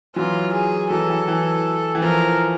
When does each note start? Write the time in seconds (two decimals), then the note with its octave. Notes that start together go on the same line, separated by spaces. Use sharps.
0.15 E3 F#3 F4
0.53 G#4
0.90 E3 F#3 A4
1.10 E3
1.28 E3
1.95 E3
2.02 F3 A#4